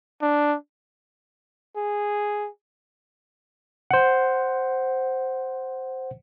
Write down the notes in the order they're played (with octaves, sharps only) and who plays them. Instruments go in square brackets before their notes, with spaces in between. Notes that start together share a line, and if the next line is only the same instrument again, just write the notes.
[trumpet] D4
[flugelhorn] G#4
[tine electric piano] C5 F#5